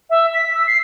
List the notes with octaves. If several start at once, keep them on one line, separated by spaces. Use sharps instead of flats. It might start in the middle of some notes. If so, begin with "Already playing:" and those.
E5
B6
E6
C7